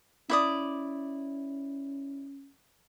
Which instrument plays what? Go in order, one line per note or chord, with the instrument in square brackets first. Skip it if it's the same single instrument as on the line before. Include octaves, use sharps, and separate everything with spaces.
[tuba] C#4 [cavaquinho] E4 D5 D#6